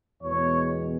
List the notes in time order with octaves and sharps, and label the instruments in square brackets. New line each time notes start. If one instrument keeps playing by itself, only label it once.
[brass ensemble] E2 B2 G#3 C#5